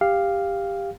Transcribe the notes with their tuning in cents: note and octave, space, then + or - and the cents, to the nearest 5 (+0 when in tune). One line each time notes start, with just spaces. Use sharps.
G4 +15 F5 +0